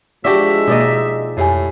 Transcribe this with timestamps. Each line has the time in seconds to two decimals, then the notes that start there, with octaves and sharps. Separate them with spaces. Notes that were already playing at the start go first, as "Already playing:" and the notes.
0.25 F3 G#3 D4 F#4 G4 E5
0.68 B2 A#3 D#4 D5 D#5
1.37 F2 A2 G4 G#5